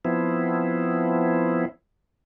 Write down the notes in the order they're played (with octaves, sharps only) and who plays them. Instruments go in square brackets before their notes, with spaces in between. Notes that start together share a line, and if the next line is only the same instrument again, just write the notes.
[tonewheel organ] F3 B3 C4 E4